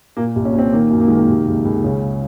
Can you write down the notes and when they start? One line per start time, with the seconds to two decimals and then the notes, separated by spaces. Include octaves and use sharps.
0.17 A#2 A#3
0.36 C2
0.45 C#4
0.54 A#2 C4
0.73 D#3 A#3
0.91 F#2
1.00 A#3
1.08 D#3 G#3
1.16 A#3
1.28 C3
1.47 C#2
1.65 C#2
1.84 C#3 C#4